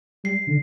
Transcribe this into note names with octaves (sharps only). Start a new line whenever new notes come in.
G3 C7
D3